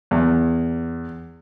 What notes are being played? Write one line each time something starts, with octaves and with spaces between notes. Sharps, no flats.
E2